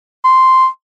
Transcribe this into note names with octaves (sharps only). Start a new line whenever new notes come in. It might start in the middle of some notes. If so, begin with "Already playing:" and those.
C6